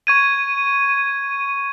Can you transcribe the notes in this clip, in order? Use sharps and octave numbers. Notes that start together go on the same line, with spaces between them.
C#6 G#6 D#7